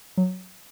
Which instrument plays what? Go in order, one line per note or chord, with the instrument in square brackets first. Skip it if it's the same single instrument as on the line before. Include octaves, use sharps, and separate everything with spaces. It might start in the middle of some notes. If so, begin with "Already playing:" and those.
[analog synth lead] F#3